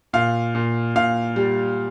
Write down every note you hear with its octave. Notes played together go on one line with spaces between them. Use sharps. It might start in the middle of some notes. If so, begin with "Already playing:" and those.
A#2 F5
A#2
A#2 F5
G3